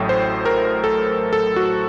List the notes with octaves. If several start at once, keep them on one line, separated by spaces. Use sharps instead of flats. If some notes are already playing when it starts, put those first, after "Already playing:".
Already playing: A1 A2 F#3 A3 G5
C5
A#4
A4
A4
F#4